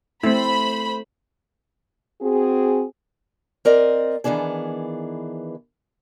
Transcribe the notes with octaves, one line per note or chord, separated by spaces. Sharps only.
A3 C4 E4 C5 B5
C4 F#4 G#4
C4 A#4 D5 D#5
D#3 E3 B3 D4 G#4